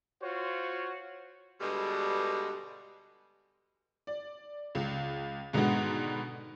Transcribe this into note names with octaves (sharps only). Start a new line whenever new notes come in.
F4 F#4 C5 C#5
G2 B2 D3 G3 G#3
D5
C#2
G#2 B2 D3 D#3 G#3 B3